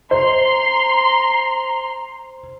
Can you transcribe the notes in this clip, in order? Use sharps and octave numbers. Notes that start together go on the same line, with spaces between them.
C5 A#5 C6